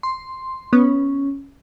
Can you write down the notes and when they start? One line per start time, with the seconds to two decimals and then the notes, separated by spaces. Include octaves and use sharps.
0.03 C6
0.73 B3 C#4